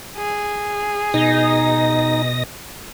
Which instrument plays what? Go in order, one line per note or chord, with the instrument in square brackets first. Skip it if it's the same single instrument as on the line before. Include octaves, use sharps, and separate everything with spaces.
[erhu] G#4
[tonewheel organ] B2 D#5 A#6 [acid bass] D#4